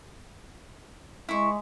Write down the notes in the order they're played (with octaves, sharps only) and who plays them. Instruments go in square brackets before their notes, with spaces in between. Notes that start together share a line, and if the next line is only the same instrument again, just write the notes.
[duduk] G#3 [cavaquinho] E4 C#6